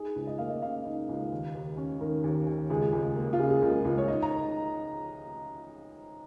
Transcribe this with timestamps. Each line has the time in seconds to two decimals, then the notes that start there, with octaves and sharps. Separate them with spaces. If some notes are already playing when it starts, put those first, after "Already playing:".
Already playing: D#4 G#4
0.16 C#2
0.27 D#5
0.38 A#3 F5
0.48 D#5
0.62 C#3 F5
0.85 D#4
1.09 C#2
1.32 D#2
1.55 D#2
1.77 C#4
2.01 D#3 A#4
2.24 D#2
2.47 D#2
2.70 C#2 G#4
2.93 C#2
3.16 A#3
3.33 F4
3.39 C#3 G#4
3.50 G#4
3.62 C#2 A#4
3.85 C#2
3.98 C#5
4.08 D#4 D#5
4.23 A#5